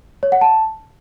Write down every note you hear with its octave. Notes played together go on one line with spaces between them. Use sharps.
C#5
F#5
A5